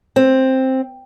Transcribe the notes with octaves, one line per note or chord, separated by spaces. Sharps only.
C4